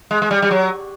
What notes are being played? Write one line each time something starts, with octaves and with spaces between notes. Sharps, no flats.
G#3
G#3
G3
G3
F#3